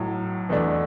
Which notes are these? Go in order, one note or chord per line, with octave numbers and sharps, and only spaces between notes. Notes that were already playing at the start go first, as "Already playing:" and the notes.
Already playing: B1 A2 F#3
E2 B2 A3 D4